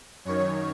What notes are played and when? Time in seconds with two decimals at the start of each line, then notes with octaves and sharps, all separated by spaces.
0.25 F#2 D#3 C#5